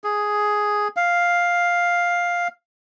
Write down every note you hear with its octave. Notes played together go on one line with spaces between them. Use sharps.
G#4
F5